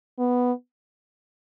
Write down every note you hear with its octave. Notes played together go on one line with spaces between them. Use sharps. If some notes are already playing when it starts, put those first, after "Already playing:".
B3